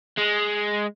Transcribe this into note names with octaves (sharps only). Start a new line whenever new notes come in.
G#3